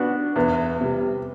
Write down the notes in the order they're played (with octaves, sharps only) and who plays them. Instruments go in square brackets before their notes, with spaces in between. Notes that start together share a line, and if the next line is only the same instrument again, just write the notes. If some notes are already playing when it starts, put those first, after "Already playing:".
Already playing: [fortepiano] B3 D4 F#4
[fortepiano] E2 [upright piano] B4
[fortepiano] C3 G3